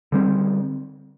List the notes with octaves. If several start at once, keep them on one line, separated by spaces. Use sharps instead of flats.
D3 G3 C4